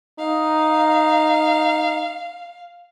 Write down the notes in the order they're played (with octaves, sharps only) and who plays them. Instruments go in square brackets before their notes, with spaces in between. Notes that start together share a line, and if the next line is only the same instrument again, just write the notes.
[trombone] D#4 [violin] F5